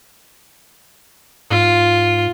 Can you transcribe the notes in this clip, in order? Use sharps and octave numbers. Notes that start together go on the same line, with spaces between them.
G#2 F4